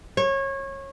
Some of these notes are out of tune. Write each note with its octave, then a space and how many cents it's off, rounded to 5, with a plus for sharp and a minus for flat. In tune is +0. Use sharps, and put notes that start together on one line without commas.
C#5 -25